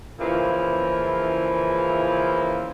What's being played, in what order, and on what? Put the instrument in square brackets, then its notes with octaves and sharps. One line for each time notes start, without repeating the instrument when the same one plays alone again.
[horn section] A#2 C#3 E3 F3 E4 F4